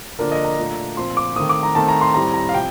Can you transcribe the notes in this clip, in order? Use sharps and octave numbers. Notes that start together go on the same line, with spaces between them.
D3 F3 A#3 D4 A#4
D#5
A#5
A#2 A3 D4
A#2 F3 C4 C6
D6
D#3 A3 C4 D#6
D6
A#5
D#3 A3 C4 A5
A#5
C6
A2 G3 C4 A#5
A#5
F5
C3 F3 G5